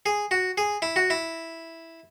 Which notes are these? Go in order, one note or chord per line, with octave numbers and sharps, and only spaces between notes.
G#4
F#4
G#4
E4
F#4
E4